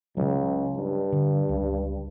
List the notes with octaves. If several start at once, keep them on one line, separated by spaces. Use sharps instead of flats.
C#2 C#3 F#3
G2
D3
C#2